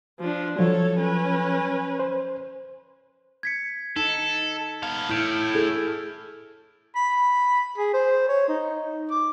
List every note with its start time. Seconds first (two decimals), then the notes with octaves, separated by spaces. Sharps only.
0.19 F3 D4
0.59 F3 F#3 A4 C#5
0.98 C#4 B4
1.99 C5
3.43 G#6 B6 C#7
3.96 D#4 A4
4.83 B3 F5 A5
5.10 A2 E4 F6 G6 D7
5.54 E4 G#4 A4
6.96 B5
7.78 G#4
7.94 C5
8.29 C#5
8.48 D#4
9.11 D6